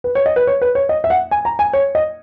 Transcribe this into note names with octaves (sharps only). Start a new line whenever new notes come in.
B4
C#5
D#5
B4
C#5
B4
C#5
D#5
E5
F#5
G#5
A#5
G#5
C#5
D#5